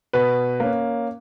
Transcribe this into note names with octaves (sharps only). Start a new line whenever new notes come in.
B2 B4
A#3 C#4